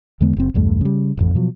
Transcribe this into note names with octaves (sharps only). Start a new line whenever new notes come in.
E2 D3 G#3 B3
F#1 C4
B1 E2 G2 A3
C#3 G3
E1 A1 F2
B2 F3 F#3